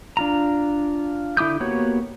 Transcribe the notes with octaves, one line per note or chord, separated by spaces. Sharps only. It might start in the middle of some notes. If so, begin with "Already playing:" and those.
D4 F4 A#5
D3 E4 D6 D#6 G6
A#3 B3 F#4 G4 C#5